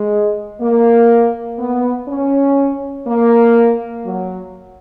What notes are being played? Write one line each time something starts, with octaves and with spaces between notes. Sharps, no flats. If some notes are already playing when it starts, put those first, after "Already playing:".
Already playing: G#3
A#3
B3
C#4
A#3
F#3